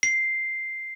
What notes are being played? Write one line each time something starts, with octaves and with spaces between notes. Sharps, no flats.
C7